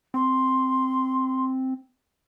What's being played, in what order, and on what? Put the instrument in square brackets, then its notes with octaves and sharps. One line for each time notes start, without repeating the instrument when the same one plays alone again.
[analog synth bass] C4 [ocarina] C6